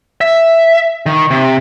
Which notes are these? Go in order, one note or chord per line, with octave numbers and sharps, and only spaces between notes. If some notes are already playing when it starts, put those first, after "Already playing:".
E5
D#3
C3